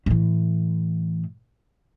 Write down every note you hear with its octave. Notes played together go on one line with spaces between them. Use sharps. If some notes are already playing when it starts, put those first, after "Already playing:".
A2 E3